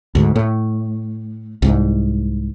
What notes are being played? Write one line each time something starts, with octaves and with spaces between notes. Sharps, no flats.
D2 G#2
A2
C2 G#2